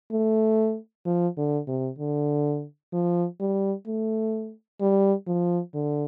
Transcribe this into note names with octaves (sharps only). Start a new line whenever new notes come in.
A3
F3
D3
C3
D3
F3
G3
A3
G3
F3
D3